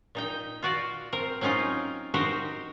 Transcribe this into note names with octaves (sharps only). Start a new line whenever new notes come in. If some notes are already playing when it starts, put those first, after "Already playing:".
A#2 D#4 G5
F4 F#4 D5
C4 A#4
F#3 C4 C#4 D#4 F4
D#4 F#4 G4 A#4 C5 D#5